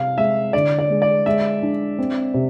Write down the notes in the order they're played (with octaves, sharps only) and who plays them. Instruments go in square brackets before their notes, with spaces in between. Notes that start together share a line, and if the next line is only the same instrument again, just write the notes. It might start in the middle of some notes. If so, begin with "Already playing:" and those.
Already playing: [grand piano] C3 [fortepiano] F5
[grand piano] G#3 [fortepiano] E5
[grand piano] D3 [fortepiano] D5
[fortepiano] D5
[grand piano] G#3
[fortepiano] D5
[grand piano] G#3 [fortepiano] E5
[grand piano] D4
C4
C3